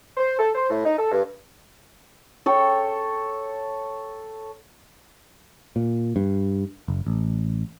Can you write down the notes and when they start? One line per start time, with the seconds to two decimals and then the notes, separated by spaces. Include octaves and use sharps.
0.17 C5
0.39 A4
0.55 C5
0.70 A2
0.85 D#4
0.99 A4
1.12 G2
2.46 A4 C#5 G5
5.76 A#2
6.16 G2
6.88 F#1
7.07 A1